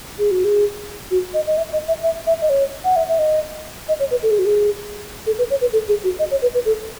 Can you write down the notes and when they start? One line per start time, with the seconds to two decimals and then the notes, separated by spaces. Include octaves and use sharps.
0.19 G#4
0.31 F#4
0.45 G#4
1.11 F#4
1.34 D#5
1.47 D#5
1.57 E5
1.73 D#5
1.88 E5
2.03 E5
2.27 E5
2.42 D#5
2.50 C#5
2.85 F#5
2.96 E5
3.09 E5
3.19 D#5
3.88 D#5
4.00 C#5
4.11 B4
4.23 A4
4.31 G#4
4.39 F#4
4.46 G#4
5.26 A4
5.38 B4
5.50 C#5
5.61 B4
5.73 A4
5.88 G#4
6.04 F#4
6.19 D#5
6.31 C#5
6.42 B4
6.54 B4
6.65 A4